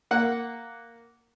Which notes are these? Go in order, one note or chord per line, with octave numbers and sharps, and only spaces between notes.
A#3 F#5